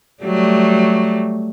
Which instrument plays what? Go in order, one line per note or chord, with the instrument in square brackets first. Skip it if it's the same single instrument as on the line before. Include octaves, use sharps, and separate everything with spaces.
[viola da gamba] F#3 G3 A3